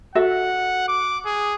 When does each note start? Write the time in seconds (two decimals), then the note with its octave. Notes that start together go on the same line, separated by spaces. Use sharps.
0.15 F#4 A4 E5 F#5
0.88 D6
1.26 G#4